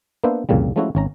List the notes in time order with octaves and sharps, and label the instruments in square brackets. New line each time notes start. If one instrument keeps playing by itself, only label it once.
[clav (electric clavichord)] A#3 B3 D4 B4 C5 E5
C2 F2 A#2 C#3 G3
F3 G#3 A3 C#4 E4 F#4
G#1 C#4 A#5